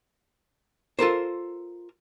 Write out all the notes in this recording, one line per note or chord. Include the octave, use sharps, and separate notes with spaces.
F4 A4 A#4 C5